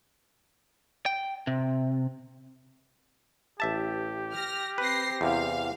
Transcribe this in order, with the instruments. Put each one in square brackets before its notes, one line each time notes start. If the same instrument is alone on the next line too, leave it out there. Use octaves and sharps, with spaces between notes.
[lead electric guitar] G5
C3
[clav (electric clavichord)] A1 E5 A5 [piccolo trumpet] G4
[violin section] F6 A#6
[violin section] C4 A#6 C7 [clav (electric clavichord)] B4
[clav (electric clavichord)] E2 C3 [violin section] F5